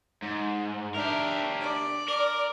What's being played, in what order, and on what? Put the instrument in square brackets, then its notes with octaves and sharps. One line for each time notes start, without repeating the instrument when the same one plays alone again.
[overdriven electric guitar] G#2
[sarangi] D4 [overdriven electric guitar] G4 A#4 [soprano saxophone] E5
[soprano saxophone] D4 [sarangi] D5
[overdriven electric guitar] A#4 [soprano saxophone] D6